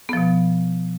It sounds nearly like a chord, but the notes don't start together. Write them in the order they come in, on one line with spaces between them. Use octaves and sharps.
B3 F3 B2